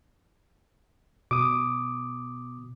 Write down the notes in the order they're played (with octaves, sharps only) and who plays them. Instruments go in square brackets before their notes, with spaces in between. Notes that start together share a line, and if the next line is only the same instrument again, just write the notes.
[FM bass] B2 [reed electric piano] D6 D#6